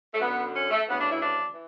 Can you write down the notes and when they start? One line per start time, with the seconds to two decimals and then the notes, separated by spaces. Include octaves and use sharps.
0.13 A3
0.20 F#2 D3 B3
0.54 C#4
0.70 A3
0.86 D2 C#3 E3 B3
0.97 D4
1.09 E4
1.21 D4
1.53 E3